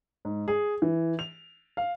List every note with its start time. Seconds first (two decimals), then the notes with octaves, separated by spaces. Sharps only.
0.25 G#2
0.48 G#4
0.82 E3
1.19 F7
1.77 F5